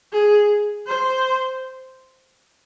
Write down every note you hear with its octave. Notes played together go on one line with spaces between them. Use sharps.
G#4
C5